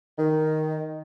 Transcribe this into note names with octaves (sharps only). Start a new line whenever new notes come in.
D#3